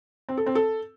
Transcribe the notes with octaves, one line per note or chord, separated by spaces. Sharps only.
C4
A4
C4
A4